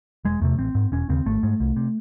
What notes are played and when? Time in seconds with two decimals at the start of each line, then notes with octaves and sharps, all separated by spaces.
0.25 E1 G#3
0.41 E2 C3 A3
0.58 A1 C4
0.75 G#2
0.92 E1 C#4
1.09 D#2 C#3 C4
1.26 G#1 A3
1.43 G#2
1.60 C2
1.76 C3